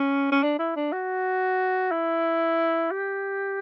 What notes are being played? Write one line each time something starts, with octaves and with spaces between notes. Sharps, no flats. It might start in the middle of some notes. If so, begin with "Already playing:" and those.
Already playing: C#4
C#4
D4
E4
D4
F#4
E4
G4